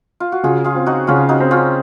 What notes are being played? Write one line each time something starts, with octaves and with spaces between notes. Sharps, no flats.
F4
F#4
C#3 F4 G#4
F4 G#4
C4
D#4 F#4
C#3 C#4 F4
D#4 F#4
C4
C#4 F4